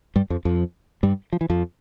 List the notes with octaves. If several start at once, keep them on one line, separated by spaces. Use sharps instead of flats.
G2 G3
F2 F3
F2 F3
G2 G3
F3
E3
F2 F3